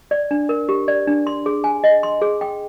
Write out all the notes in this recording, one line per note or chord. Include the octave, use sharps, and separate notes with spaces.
D5
D4
A#4
G4
D5
D4
C6
G#4
G#5
D#5
C6
G#4
G5